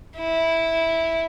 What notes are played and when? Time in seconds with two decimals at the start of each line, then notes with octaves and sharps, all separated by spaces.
0.17 E4